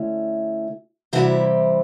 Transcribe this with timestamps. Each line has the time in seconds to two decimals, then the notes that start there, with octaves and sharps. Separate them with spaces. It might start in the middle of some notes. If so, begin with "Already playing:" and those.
Already playing: D3 A3 C#4 E4
1.13 C3 E3 G3 C4 E4 F#4 G#4